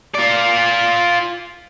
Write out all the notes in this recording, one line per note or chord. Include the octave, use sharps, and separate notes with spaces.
F4 D5